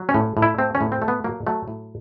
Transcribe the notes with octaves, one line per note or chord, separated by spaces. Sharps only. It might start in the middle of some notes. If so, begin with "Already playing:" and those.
Already playing: F#3
C#4
A2
A2
E4
A3 C4
C#4
A2
C4
A3
B3
F#3 A#3
F#3 A3
A2